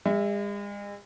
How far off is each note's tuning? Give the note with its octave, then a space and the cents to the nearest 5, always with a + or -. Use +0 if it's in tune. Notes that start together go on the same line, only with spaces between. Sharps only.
G#3 -40 E5 +5